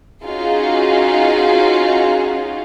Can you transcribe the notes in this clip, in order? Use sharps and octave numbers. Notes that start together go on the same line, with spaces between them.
C#4 D#4 F4 F#4 G#4